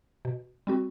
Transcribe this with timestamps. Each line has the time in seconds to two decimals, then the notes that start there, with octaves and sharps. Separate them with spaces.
0.25 B2
0.67 G3 C4 F#4